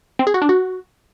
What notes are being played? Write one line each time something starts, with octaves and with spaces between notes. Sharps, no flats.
C4
G#4
F#4
D4
F#4